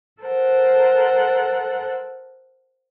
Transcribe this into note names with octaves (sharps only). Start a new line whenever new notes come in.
A4 A#4 C5 F#5